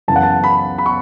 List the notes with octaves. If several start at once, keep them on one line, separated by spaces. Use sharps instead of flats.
F#2 C#3 E3 B3 A5
F#5
A5
B5
B5
C#6